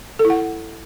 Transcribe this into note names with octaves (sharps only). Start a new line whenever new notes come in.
A4
E4
F#5